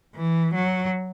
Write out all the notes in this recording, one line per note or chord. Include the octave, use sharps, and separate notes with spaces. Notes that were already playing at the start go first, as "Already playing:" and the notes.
E3
F#3